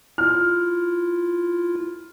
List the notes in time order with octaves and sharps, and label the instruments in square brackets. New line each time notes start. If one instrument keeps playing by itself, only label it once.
[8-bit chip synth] E4 F4 [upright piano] F6